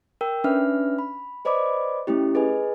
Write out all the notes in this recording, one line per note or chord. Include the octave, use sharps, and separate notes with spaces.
A#4 G5 E6
C#4 D4 B4 E5 F6
B5
B4 C5 D5 D#5 B5 D6
A3 C#4 E4 G4
G#4 B4 D#5 G#5